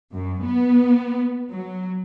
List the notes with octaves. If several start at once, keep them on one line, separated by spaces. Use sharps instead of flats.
F#2
B3
F#3